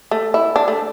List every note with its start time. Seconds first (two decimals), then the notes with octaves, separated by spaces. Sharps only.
0.11 A3
0.34 E4
0.56 D4
0.68 A3